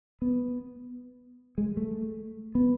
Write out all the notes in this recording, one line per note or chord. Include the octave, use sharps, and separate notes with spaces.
B3
G#3
A3
B3